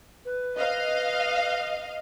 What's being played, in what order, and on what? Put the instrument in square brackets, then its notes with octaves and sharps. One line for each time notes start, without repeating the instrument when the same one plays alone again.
[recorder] B4
[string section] D#5 F5